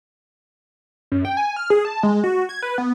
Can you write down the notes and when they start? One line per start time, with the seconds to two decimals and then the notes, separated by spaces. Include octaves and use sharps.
1.12 F#2
1.25 G5
1.37 G#5
1.57 F6
1.70 G#4
1.85 A5
2.03 G#3
2.24 F#4
2.49 G#6
2.62 B4
2.78 B3